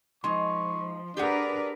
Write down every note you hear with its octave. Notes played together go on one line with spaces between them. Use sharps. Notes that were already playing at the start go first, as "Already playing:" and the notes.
F3 G#3 D#4 C6 C#6
D4 G4 G#4 A#4 B4 D5 F#5